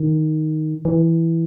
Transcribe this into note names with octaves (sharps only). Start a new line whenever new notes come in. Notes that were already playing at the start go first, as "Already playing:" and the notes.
Already playing: D#3
E3